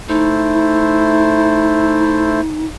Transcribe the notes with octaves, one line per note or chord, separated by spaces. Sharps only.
A3 D#4 E4 C5